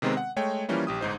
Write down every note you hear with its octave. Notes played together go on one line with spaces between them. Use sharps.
C3 D#3 G#3 B3 C4 A#4
F#5
G#3 A3 C#5 G5
E3 F3 G3 A#3 C#4 E4
A#1 G4 D#6
G1 G#2 D#4 C5